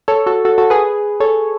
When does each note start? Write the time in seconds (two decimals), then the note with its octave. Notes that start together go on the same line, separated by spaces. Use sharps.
0.08 A4 C#5
0.26 F#4 A4
0.45 F#4 A4
0.58 F#4 A4
0.70 G#4 B4
1.20 A4 C#5